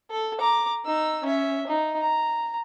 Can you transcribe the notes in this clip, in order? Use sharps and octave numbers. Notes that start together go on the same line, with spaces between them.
A4
A#5 D6
D#4 E6
C#4 E5
D#4
A#5